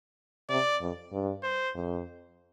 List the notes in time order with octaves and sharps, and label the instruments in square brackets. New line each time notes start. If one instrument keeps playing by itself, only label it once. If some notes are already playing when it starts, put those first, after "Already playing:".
[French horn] C3 [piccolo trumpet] D5
[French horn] F2
G2
[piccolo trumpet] C5
[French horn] F2